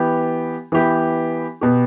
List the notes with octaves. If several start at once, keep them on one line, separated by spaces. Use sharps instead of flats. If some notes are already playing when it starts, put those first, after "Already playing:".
Already playing: E3 B3 G4
E3 B3 G4
B2 B3 G4